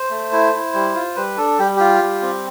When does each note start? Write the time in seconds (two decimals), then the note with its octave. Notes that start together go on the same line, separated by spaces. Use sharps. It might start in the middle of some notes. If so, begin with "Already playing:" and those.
Already playing: C5
0.10 A3
0.32 E4
0.53 E4
0.74 G3
0.95 F4
1.16 G3 B4
1.37 D4 A4
1.59 G3 G4
1.76 F4 G4
2.02 G3
2.22 C4